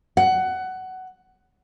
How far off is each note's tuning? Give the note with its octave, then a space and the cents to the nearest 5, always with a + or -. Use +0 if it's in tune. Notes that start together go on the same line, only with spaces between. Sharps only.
F#5 +15